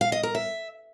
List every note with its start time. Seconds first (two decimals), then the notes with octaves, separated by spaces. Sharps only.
0.01 F5
0.12 D#5
0.23 A#4
0.35 E5